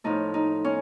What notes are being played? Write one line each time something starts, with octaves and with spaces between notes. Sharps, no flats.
A2 F3 A3 D#4
D#4
C#4